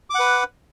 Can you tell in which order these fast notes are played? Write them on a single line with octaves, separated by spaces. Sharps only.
D6 F#5 B4